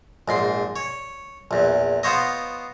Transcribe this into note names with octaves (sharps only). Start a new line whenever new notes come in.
A#1 G#2 C6
C#5
A#1 E2
B3 F4 C5 C#5 D#5